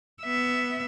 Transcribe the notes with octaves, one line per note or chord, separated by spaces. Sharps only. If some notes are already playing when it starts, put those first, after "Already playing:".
B3 E5